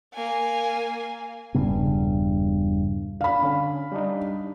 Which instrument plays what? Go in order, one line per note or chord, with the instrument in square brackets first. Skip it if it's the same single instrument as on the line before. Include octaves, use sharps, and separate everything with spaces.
[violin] A#3 G#5
[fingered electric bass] E1 G2 C#3 B3
[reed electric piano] D4 [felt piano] F5 B5
[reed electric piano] D3 C#4
G3 D4 D#4